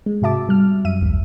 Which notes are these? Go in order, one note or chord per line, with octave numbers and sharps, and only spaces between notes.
G#3
G#2 C3 F#4 E5 A5 D6
B2 G3 F6
F#2 E5 D#7
A1 D#2 G#2